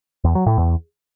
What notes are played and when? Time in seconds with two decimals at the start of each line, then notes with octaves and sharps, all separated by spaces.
0.24 E2
0.35 F#3
0.46 A2
0.57 E2